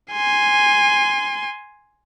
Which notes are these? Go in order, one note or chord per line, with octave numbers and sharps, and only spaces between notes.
G#5 C6